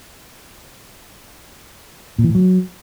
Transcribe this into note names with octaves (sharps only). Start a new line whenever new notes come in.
A#2
E3
A2
F#3